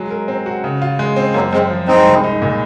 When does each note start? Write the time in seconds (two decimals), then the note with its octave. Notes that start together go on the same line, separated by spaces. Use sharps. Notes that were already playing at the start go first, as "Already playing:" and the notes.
Already playing: F#3 G#3
0.10 A#4
0.28 C4
0.46 F#4
0.64 C#3
0.82 F4
0.99 G#3
1.16 C4
1.34 F#2 F#3 A#3
1.53 F#2 G#3 C4
1.70 F3
1.88 G#3 C4 D#4
2.06 C2
2.24 D#4
2.42 A#2